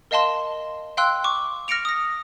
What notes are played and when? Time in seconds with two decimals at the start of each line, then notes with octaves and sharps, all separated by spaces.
0.11 A#4 D#5 F5 A5 C6 E7
0.97 F5 G5 C6 E6 F#6
1.24 C#6 D6
1.68 F6 A#6 C#7 D7 F7
1.85 D#6 A#6